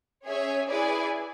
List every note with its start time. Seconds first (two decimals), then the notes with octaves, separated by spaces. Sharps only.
0.26 C#4 G#4 C#5 E5 G#5
0.69 E4 G#4 B4 D5 G#5